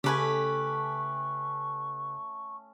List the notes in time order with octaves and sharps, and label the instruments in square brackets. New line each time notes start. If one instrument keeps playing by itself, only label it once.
[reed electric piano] C#3 [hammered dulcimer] A3 C#4 A5 [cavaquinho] G4 B4 G#5 [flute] C#6